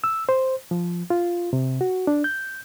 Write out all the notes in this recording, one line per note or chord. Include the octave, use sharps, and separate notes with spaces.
E6
C5
F3
F4
C3
F#4
D4
G6